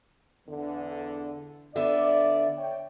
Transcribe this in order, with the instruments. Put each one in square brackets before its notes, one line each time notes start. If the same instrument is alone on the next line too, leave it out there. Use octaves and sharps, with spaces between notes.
[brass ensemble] E2 D3
[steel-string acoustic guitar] D3 B3 E5 [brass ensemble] D5
[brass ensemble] C#5 G5